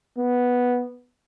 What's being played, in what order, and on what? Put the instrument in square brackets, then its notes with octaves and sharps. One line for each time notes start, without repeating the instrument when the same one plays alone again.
[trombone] B3